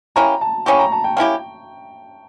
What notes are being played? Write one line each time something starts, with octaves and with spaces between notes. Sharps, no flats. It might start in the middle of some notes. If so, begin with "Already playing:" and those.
A#3 C#4 E4 G4 A#5
A5
A#3 C#4 E4 G4 C#6
A#5
A5
G5
A#3 C#4 E4 G4 G5